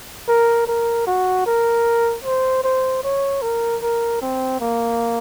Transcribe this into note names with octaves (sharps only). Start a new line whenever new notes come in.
A#4
A#4
F#4
A#4
C5
C5
C#5
A#4
A#4
C4
A#3